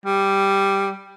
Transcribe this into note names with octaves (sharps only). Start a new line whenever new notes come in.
G3